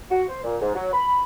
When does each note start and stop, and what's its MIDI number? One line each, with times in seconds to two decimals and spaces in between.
0.11 0.22 66
0.28 0.39 72
0.44 0.56 46
0.61 0.72 44
0.75 0.90 54
0.93 1.24 83